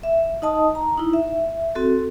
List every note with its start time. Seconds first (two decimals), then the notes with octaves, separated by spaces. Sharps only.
0.03 E5
0.42 D#4 D#5 A5 D#6
0.75 A#5
0.98 D#4 E4
1.13 E5
1.75 C4 F#4 A4